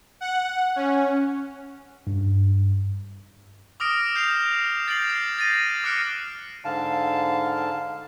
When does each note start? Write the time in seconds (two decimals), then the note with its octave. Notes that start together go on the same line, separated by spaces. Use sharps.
0.21 F#5
0.76 C#4
2.07 G2
3.80 D6 D#6 F6 A#6 D7
4.15 G6 C7 E7 F7
4.87 G6 A6 C7 D7 F#7
5.09 C7
5.37 G6 A6 A#6 D#7
5.84 D6 F6 F#6 C#7 D7
6.65 G#2 D3 F5 A5